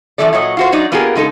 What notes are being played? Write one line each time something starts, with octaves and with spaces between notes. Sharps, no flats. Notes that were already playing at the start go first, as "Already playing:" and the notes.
F#2 A2 C#3 E3 A3 D5
A#2 F#3 C#5 D#5
F4 F#4 C5
F#3 D#4 D5
A#3 B3 F4 G4 G#4 A#4
C#3 G#3 D#4 A4